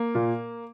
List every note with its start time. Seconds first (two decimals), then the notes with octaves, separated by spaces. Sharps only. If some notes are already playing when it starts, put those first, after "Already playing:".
Already playing: A#3
0.15 A#2